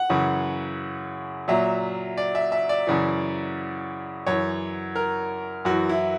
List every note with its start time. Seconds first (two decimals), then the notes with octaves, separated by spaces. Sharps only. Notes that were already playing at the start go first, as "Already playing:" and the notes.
Already playing: F#5
0.09 F#2 C#3 E3
1.48 A#2 F#3 E5
2.17 D5
2.35 E5
2.52 E5
2.69 D5
2.87 F#2 C#3 E3
4.27 F#2 E3 C#5
4.96 A#4
5.65 F#2 E3 F#4
5.89 E4